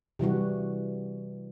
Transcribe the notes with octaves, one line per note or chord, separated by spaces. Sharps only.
C3 E3 G3 F#4